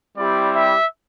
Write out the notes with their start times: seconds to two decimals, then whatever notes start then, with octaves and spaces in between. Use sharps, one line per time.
0.17 G3 C4 E4 G4 D5
0.55 E5